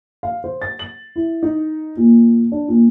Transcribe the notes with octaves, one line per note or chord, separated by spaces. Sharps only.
F5
C5
A6
F#7
E4
D#4
A#2
D4
A#2